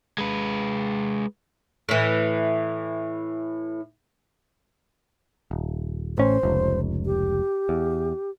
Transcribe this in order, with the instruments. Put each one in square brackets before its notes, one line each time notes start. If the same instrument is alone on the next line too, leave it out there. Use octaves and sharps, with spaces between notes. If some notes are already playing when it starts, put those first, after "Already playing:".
[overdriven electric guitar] G#3 B4
[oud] A2 E3
[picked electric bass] D#1
[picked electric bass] A1 A2 C#4 [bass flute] C5
[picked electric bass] F1 C#2
[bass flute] G4
[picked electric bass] E2